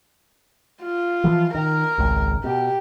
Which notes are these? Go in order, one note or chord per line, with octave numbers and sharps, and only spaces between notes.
F4
E3 F3
D#3 A#4
G#1 C#2
B2 G4